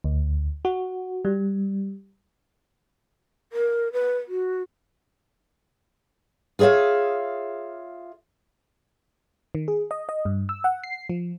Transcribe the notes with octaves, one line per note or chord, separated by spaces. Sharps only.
D2
F#4
G3
A#4
B4
F#4
F4 G#4 C#5 E5 F5
D#3
G#4
D#5
D#5
G2
E6
F#5
C7
F3